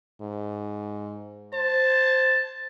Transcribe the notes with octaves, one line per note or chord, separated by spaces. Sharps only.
G#2
C5 A5